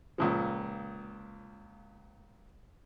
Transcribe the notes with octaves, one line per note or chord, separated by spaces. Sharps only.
C#2 A#2 F3